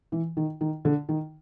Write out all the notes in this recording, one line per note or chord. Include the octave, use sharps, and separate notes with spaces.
E3
D#3
D#3
D3
D#3